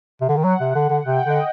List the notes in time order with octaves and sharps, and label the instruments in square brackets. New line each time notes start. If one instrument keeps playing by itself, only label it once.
[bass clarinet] C3
D3
D#3
[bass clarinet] F#3 [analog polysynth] F#5
[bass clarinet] C3
D3
D3
[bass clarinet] C3 [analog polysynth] G5
[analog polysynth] F#5
[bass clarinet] D3 [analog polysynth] D#5